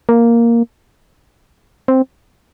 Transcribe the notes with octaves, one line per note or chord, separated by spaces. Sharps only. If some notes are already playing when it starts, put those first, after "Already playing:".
A#3
C4